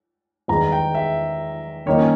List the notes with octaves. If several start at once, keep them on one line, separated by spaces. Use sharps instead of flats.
E2 D#3 G#3 A#5
G5
E5
D#3 A#3 D#4 C#5
C#4